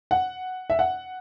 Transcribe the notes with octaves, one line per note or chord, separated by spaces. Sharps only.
F#5
E5
F#5